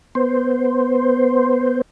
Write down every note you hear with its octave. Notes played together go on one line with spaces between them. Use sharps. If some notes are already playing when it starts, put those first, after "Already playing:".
B3 C5